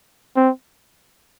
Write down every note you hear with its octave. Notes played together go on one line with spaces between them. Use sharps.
C4